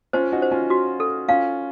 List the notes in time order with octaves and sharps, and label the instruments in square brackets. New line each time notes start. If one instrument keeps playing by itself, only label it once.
[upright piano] C#4 F4 [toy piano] C5
[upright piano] D#4 F#4
[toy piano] C5
[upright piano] C#4 F4
[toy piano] F#4
A4
[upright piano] C#4 F4 [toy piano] F5